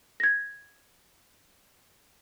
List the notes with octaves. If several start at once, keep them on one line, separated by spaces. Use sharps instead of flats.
G#6 A#6